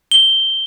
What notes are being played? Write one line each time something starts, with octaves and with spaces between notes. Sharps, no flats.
G7